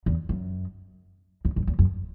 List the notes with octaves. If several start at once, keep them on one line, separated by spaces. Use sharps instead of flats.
E2
F#2
E2
F#2
E2
F#2